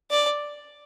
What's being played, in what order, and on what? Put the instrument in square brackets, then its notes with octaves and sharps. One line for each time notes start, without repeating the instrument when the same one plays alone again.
[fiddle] D5